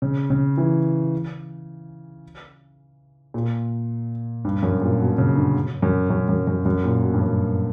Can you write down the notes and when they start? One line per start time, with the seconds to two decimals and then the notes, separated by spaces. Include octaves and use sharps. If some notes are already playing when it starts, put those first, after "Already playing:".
0.02 C#3
0.30 C#3
0.57 E3
3.34 A#2
4.45 G2
4.63 F#2
4.82 A#2
5.00 B2
5.18 C#3
5.36 D3
5.82 F#2
6.10 F#2
6.29 F#2
6.47 F#2
6.66 F#2
6.84 A#2
7.03 B2
7.14 G2
7.21 F#2